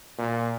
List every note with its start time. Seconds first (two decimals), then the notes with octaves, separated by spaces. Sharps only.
0.18 A#2